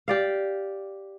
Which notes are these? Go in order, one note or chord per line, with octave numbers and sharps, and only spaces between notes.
G4 D5 F5